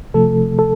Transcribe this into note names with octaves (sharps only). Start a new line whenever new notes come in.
C3 F3 A3 A4
A4